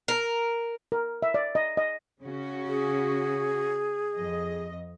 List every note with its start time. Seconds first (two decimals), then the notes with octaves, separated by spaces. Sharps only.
0.08 A#4
0.92 A#4
1.22 E5
1.34 D5
1.55 D#5
1.77 D#5
2.21 C#3 C#4 F#4
2.66 G#4
4.16 F2 D#5